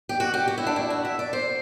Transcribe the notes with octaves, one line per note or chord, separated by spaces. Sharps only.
G4
F#4
G4
F#4
E4
D4
E4
F#4
E5
D5
C5